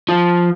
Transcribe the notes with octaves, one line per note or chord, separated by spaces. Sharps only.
F3